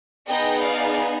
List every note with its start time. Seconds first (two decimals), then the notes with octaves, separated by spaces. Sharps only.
0.27 B3 D#4 G#4 D#5 G5
0.62 D5 F5